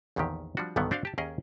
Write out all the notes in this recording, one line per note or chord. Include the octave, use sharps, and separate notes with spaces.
A#1 E2 A#2 D3 D#3 G4
F3 G3 C4 D4 F#4
B1 G2 B2 D3 D#3 B3
C4 D4 F#4 C5 D5 F5
G4 A5
D#2 C#4 G#4 A#4 D#5